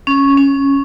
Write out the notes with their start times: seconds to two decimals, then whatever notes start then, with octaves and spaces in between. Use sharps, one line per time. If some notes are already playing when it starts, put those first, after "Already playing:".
0.07 C#4
0.37 C#4